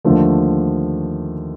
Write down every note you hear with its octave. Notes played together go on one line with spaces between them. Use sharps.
D#2 D3 F3 A3